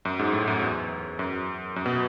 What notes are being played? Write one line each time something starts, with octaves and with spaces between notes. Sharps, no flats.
F#2
G#2
A2
F#2
E2
F#2
F#2
B2